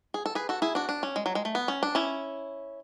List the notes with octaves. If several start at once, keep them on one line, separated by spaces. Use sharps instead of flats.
G#4
A4
G#4 B4
F#4 A4
E4 G#4
D4 F#4
D4
C#4
G#3
F#3
G#3
A3
B3
C#4
D4
C#4 E4